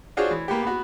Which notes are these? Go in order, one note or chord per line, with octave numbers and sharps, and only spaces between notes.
D4 F4 F#4 G#4 C5 C#5
E3
A#3 B3 G4
B3 F#4